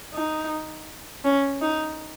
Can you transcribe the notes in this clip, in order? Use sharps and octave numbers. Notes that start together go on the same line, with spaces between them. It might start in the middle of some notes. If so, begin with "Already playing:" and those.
D#4
C#4
D#4